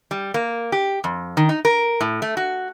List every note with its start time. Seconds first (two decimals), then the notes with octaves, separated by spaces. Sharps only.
0.11 G3
0.34 A#3
0.72 G4
1.04 F2
1.37 D#3
1.49 D#4
1.65 A#4
2.01 A2
2.22 A3
2.37 F#4